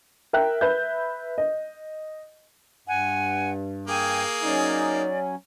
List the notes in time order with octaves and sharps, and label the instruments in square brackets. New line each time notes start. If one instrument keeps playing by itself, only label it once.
[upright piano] A#4 E5 G5 F#6
B4 E5 G6
D#5
[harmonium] G2 [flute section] F#5 G#5
[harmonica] A#3 G#4 [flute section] G5 G#5
[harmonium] F#3 C#4 [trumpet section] D#4 [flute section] D5